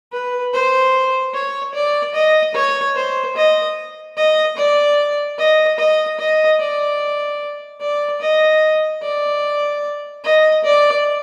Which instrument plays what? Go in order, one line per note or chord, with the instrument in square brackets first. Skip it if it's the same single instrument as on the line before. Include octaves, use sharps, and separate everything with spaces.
[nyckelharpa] B4
C5
C#5
D5
D#5
C#5
C5
D#5
D#5
D5
D#5
D#5
D#5
D5
D5
D#5
D5
D#5
D5